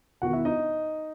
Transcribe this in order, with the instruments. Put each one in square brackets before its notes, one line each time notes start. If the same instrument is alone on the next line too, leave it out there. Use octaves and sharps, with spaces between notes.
[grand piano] E1 E2 D#3 F#4 F#5
E4 E5
D#4 D#5